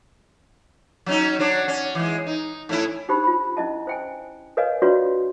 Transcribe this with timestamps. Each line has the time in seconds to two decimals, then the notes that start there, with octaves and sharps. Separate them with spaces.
1.06 F#3 C#4 D#4
1.39 F#3 D4 C#5
1.68 C#4
1.95 E3 G#3
2.26 D#4
2.69 A2 C#4 E4
3.08 D4 D#4 G4 C5 B5
3.24 F4 B5
3.57 C#4 E4 D#5 A5
3.87 C5 G5 G#5
4.57 A#4 B4 C#5 D#5 F5 G#5
4.82 D4 F4 F#4 B4 C#5 D5